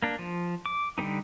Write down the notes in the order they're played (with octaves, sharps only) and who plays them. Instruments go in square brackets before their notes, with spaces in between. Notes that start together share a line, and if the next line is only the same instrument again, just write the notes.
[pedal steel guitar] A#3 D4
F3
D6
D3 G3 B3 D#4